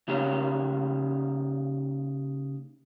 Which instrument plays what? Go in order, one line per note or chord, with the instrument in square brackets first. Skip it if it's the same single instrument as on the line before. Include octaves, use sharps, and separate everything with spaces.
[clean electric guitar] C#3 A#3 D#4 G4 G#4 C#5